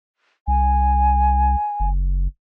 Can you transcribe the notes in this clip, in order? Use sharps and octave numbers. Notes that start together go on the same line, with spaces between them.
C2 G#5
F#1